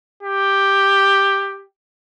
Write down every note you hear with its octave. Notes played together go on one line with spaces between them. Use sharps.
G4